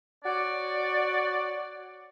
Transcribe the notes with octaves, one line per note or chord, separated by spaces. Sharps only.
F#4 C#5 D5